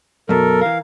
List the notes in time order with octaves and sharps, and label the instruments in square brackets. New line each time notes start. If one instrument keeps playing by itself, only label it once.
[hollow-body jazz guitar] F#2 B2 [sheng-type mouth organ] A4 A#4
[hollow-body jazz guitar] E3 A#4 [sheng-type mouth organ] F5